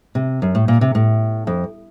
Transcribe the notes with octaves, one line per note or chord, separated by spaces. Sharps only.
C3
F#2
A2
A#2
C3
A2
F2